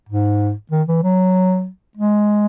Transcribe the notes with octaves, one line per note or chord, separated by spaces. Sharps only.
G#2
D#3
E3
F#3
G#3